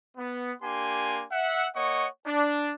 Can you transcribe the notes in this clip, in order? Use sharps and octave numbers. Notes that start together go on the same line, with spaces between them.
B3
A#3 D4 G4 G#5 C6
E5 F#5
A#3 C#5 D#5 F#5 C#6
D4